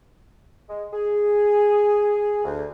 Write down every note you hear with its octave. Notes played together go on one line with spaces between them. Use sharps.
G#3
G#4
D2